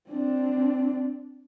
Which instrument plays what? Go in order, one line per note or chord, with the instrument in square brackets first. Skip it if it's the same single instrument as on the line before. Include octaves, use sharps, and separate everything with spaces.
[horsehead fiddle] C4 D4